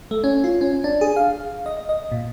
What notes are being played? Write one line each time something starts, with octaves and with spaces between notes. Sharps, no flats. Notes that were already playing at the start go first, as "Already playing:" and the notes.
A3
C#4
F4
C#4
D4
G#4
F5
D#5
D#5
A#2